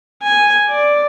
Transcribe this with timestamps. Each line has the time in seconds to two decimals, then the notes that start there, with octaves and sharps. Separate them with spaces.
0.23 G#5
0.69 D5